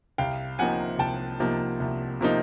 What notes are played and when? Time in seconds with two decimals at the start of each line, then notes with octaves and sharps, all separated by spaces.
0.18 C2 F5 G5
0.59 C3 F3 A#3 D#4 F#5 G#5
0.99 C2 G5 A5
1.40 C3 F3 A#3 D#4
1.80 C2
2.21 C3 F3 A#3 D#4